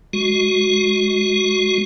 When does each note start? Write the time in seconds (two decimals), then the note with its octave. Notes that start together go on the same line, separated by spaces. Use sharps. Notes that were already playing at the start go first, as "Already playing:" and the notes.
0.13 G#3 F#4